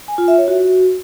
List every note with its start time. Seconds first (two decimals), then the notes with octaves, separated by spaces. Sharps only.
0.08 G#5
0.18 F4
0.28 E5
0.38 C#5
0.48 F#4